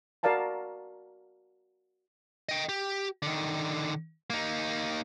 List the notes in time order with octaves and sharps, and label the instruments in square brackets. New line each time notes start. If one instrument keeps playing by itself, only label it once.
[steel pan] F#4 A#4 D5 F5 A5 A#5
[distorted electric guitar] D#5 G5
G4
D3 D#3
A#3 D#4